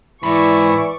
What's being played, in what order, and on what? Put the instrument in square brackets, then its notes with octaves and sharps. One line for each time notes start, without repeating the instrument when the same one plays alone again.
[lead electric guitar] G#2 B5 [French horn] E3 [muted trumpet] E4 [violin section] D5 C#6